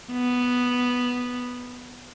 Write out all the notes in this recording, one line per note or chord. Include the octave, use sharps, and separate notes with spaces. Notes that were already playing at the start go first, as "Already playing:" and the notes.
B3